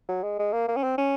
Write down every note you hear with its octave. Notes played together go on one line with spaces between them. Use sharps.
F#3
G#3
G#3
A#3
A#3
C#4
C4
C#4